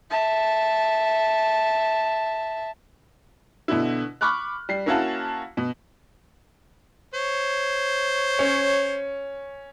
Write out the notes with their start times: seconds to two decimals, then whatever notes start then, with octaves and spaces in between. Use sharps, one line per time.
0.10 E5 A5
3.68 B2 D3 E4
4.21 B5 C#6 D6 F6 F#6
4.69 G3 C7
4.86 A#3 C#4 E4 F#4 F5 A5
5.57 B2
7.14 C5 C#5
8.39 C#4